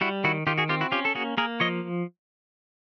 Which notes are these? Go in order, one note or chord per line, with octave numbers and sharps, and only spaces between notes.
G3 E4 F#4
D#3 E4 F#4
D#3 F4 G4
F#4 G#4
C4 F4 G4
E4 F#4
C#4 F4 G4
A4
A#3 F#4 G#4
A#3 G#4 A#4
F3 C#5 D#5